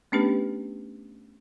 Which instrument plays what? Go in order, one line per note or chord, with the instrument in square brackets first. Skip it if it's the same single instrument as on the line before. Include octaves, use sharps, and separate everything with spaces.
[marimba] A3 B3 C#4 D4 G4 B4